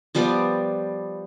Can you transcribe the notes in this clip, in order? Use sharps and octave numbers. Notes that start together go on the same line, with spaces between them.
F3 G3 B3 D5